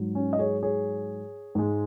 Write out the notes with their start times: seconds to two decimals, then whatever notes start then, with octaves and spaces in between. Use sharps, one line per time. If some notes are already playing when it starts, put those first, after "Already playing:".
Already playing: G#2 F#3
0.15 C#4
0.33 D#5
0.39 G#4 C#5
0.63 G#4 C#5
1.55 G#2 G#3